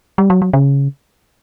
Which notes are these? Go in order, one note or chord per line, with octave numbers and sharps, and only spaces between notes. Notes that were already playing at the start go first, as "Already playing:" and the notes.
G3
F#3
F#3
C#3